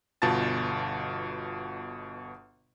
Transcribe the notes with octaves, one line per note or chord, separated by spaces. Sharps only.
G1 B2 F4 A5 A6